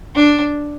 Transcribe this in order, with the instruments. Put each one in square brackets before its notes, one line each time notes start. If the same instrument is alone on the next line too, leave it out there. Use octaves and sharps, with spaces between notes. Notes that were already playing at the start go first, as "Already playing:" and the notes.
[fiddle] D4